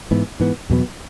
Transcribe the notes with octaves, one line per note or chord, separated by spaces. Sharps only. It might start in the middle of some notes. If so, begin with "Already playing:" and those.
G#2 E3 B3
G#2 E3 B3
E2 B2 F#3 B3